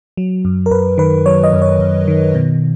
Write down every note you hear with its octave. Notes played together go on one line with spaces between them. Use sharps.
F#3
F#2
A#4
F#2 B4
D#3 B4
F#3 C#5
D#5
F#2
C#5
F#2
D#3
B2